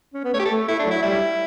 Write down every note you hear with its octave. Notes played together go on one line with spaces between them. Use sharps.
C#4
B3
A3 C#5
G4
A4
A3
A3 E4
D4
F#3 E4
G3 E4